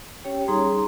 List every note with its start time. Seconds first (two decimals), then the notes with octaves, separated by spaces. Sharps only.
0.24 C#4 G4 C#5 G5
0.48 G3 D#4 G#4 A#5 C6